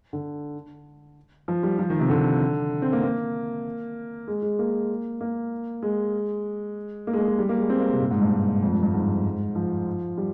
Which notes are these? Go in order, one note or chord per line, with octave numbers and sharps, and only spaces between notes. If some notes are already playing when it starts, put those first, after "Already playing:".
D3
F3
G3
F3
D#3
C3
D3
C4
A#3
A#3
G#3
G#3
A#3
A#3
G#3
A#3
G#3
A#3
G#3
G3
A#3
G#3
C4
A#3
C3
A#2
G#2
G2
F2
G2
G2
G#2
F3
G3